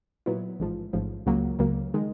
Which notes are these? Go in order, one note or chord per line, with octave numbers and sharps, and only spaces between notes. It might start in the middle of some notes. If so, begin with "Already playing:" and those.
A#2 F#3 B3 E4
A1 G#2 F3
A1 G#2 F3
C#2 C#3 F#3 A#3
C#2 C#3 F#3 A#3
D#3 G#3